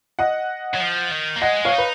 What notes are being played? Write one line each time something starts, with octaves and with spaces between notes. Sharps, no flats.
D#5 F#5
F#3
F3
D#3
A#3
G#3 D#5 F#5
C#5 F5
D#4
B4